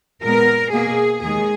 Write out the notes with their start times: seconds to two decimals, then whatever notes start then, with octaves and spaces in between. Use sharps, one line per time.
0.23 A#2 G#3 B3 A#4
0.72 B2 A#3 G#4
1.22 D#2 D#3 G#3 G#4